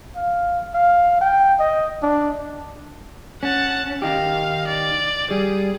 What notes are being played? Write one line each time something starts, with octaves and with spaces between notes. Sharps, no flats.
F5
F5
G5
D#5
D4
C#4 F#5 A5
D#3 D#4 G4 F5
D5
G3 G#4